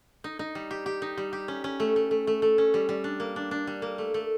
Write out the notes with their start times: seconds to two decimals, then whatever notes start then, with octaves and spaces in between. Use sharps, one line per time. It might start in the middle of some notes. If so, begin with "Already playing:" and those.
0.24 D#4
0.39 D#4
0.55 G3
0.71 G4
0.86 G4
1.02 D#4
1.17 G3
1.33 G4
1.48 C#4
1.64 C#4
1.80 A3
1.96 A3
2.11 A3
2.27 A3
2.42 A3
2.58 C#4
2.74 G3
2.89 G3
3.04 D4
3.20 A#3
3.36 D4
3.51 D4
3.67 G3
3.82 A#3
3.98 A3
4.14 A3